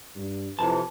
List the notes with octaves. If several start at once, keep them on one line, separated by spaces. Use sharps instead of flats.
G2
F2 C3 E3 A5